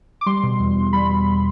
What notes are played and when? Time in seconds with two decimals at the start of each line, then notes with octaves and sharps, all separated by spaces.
0.21 D6
0.26 G3 C6
0.43 B2
0.60 E2
0.76 E2
0.93 G3 B5
1.10 B2